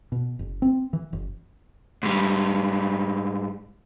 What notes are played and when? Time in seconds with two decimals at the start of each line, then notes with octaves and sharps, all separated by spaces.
0.12 B2
0.39 F#1
0.62 C4
0.93 E3
1.13 F#1
2.03 G#2 G3